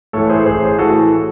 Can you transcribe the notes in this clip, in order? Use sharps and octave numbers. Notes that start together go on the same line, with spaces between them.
A2 E3 A4 C#5
G#4 C5
A1 G#4 C5
A2 E3 F#4 A4